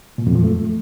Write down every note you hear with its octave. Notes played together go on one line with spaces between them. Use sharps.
A#2
F2
F3
A3